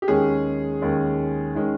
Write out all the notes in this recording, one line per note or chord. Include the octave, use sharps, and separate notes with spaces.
G4
D#2 D#3 G#3 C#4 G#4
D#2 D#3 G#3 C#4
D#3 G#3 C#4